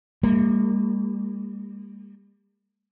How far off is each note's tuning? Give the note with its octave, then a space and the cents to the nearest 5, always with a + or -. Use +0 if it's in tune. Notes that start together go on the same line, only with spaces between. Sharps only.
G3 +40 A#3 -20